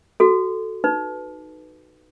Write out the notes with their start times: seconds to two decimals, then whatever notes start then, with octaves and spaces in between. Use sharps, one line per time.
0.20 F#4 A4
0.84 D#4 B4